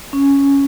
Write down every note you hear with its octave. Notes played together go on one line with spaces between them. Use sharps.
C#4